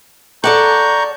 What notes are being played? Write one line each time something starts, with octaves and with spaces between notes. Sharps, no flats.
A4 D5 F#5 A#5 C#6 G6